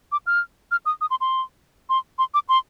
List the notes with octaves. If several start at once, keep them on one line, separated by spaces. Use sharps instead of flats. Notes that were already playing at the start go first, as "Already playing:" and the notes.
D6
F6
F6
D#6
D#6
C6
C6
C6
C6
D6
C6